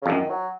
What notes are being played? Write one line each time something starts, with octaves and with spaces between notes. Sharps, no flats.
C#3
F2
F#2 D#3
F#3